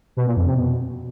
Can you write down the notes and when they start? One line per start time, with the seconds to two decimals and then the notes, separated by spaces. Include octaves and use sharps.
0.17 B2
0.26 A#2
0.36 F2
0.46 C3
0.56 B2